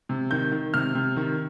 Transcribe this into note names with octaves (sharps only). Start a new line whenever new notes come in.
C3
D#3 G6
D#3
C3 F6
C3
D#3